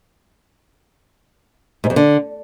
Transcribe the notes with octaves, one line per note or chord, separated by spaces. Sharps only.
G#2
F2
D3